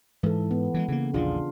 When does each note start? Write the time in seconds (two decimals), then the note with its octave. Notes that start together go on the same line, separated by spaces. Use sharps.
0.23 G#2 E3 A4
0.51 B3
0.74 E3 G3 G#3
0.88 C#3 E3 A#3
1.14 A#1 E2 D3 D4 F4 G#4